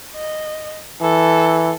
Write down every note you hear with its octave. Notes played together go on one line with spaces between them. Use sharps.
D#5
E3 A4